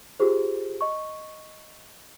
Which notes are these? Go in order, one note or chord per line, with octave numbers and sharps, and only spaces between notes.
F4 G4 G#4 C5
D#5 C#6